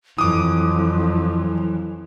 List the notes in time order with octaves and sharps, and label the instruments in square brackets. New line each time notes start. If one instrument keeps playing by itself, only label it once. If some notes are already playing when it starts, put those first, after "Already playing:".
[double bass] F2 [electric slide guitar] E3 [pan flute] F#3 [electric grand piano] D6 D#6